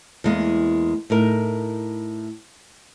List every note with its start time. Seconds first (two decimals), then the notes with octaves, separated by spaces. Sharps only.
0.24 E2 G#3 A#3
1.10 A2 D#4 A#4